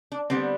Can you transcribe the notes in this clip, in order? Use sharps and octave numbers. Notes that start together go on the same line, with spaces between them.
D4
D3 G3 B3 C4